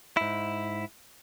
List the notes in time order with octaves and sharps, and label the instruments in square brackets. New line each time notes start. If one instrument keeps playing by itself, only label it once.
[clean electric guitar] G#2 E4